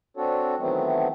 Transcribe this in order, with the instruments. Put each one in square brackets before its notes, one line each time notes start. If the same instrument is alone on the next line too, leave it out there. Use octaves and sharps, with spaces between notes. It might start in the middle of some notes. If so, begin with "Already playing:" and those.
[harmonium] C4 D4 F#4 A4 C#5
D#3 E3 F#3 A3 B3 C4